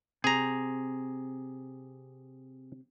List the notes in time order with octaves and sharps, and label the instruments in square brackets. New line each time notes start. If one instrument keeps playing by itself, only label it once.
[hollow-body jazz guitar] C3 [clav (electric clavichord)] G#4 A#5